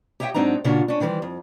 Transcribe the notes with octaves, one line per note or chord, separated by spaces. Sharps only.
G4 C#5 D#5 E5 F#5 G5
G#2 F#3 C4 D4 D#4 A#5
A#2 C#3 C#4 D4 F4 F#4
C#4 D4
D#3 E3 G3 A4 C5
F2